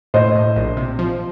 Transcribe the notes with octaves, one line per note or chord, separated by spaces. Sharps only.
A2 C5 D#5
A2
A#1
C3
F3